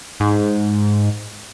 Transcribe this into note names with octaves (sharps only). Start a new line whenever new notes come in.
G#2